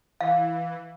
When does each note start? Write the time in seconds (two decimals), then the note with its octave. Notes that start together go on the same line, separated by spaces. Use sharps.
0.21 E3 F5